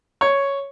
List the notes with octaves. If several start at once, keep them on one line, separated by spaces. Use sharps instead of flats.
C#5